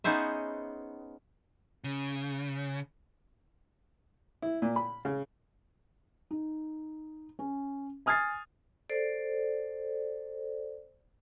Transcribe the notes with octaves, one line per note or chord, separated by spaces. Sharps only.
B3 C#4 D#4 G#4 C5 E5
C#3
E4
A#2
B5
C#3
D#4
C#4
G#5 D#6 F6 G#6 A6 C7
A4 C5 D5